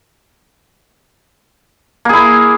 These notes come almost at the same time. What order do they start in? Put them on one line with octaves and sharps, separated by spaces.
A#3 G#4 E4